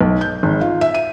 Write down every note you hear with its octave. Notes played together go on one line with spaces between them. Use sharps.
B1
G6
G#1
F4
E5
D#7